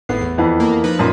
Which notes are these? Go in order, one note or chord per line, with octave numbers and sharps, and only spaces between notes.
G#1 A2 B3 C7
E2
F2 E3 B3
A#3
F3 D#4 B4
F#2 A#2